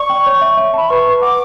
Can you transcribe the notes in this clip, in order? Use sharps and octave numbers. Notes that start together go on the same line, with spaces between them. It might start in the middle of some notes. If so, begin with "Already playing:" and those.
Already playing: D5 C#6
G5
C#5
E5
E5
A5 B5
B4 C#6
B4
F#5 D6